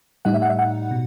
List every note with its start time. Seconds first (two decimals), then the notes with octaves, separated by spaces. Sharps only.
0.25 A2 G3 D#4 F#5
0.34 E5
0.42 F#5
0.50 E5
0.59 F#5
0.91 B2